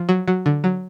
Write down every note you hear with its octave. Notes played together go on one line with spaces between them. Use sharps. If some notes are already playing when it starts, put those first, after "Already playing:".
Already playing: F3
F#3
F#3
D3
F#3